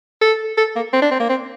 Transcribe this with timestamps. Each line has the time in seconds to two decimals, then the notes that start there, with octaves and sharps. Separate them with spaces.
0.22 A4
0.58 A4
0.76 A#3
0.93 C4
1.02 D4
1.11 C4
1.20 A#3
1.29 C4